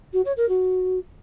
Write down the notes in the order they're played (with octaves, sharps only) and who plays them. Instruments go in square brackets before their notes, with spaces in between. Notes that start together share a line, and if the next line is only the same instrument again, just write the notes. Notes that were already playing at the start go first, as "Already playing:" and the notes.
[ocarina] F#4
C#5
A#4
F#4